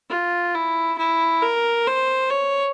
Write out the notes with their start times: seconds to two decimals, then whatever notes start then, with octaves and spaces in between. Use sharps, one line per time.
0.10 F4
0.54 E4
0.98 E4
1.42 A#4
1.87 C5
2.30 C#5